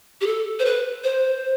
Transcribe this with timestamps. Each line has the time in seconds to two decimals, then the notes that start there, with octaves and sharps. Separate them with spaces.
0.21 G4
0.26 A4
0.59 C5
0.65 B4
1.04 C5